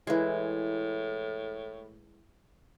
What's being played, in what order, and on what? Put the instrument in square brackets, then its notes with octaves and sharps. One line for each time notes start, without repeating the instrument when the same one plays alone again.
[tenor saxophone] A2 [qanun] E3 G#3